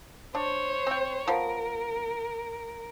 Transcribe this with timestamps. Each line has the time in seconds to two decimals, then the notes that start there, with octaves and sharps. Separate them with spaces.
0.35 D4 C5 C#5
0.87 C4 G5
1.28 F3 B3 A#4